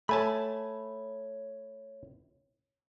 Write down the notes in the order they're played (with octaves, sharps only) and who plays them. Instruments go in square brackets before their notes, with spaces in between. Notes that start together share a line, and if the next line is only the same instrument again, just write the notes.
[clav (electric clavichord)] A3 G#5 A5 [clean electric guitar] C#5 B5